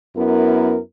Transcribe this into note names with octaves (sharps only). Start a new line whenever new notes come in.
F#2 B3 E4 A#4